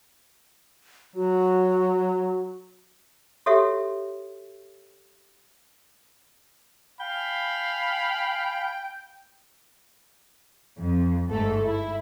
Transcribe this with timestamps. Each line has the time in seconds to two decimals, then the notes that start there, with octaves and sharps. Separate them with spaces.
1.16 F#3 F#4
3.46 F#4 G4 A4 C#5 E5
7.00 F5 G5 G#5 B5
10.78 F2
11.30 G1 G#2 A3 A4
11.64 E4